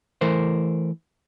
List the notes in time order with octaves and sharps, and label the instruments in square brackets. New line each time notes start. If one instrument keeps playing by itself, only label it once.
[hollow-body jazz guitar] E3 A3 A#4 C5